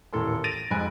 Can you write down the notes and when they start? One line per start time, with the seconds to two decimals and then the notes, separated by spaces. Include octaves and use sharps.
0.13 D#1 E2 A2 A4 A#4 C6
0.44 A6 A#6 D7 D#7 F7
0.71 F2 G#2 G#5 B5 F#6 D7